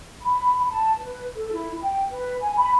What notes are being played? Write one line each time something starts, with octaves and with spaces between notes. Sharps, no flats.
B5
A5
B4
A4
E4
G5
B4
G#5
B5